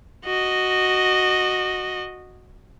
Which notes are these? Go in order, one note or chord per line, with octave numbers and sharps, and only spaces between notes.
F#4 D#5